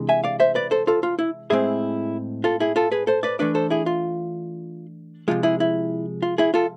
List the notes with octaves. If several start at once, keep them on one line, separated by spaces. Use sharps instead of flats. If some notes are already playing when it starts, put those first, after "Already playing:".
Already playing: C3 E3 G#3 D4
E5 G#5
D5 F5
C5 E5
B4 D5
A4 C5
F4 A4
F4
E4
A2 G#3 C4 E4 G#4
F4 A4
E4 G#4
F4 A4
G#4 B4
A4 C5
B4 D5
E3 A3 D4 B4 D5
A4 C5
E4 G#4
F4
C3 F3 G#3 F4
E4 G#4
E4
F4
E4 G#4
F4 A4